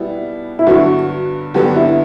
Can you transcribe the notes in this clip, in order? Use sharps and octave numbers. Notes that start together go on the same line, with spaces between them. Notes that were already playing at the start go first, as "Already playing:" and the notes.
Already playing: B2 G3 B3 E4
E4
G2 D3 F#3 B3 F#4
G2 D3 F#3 B3 G4
E4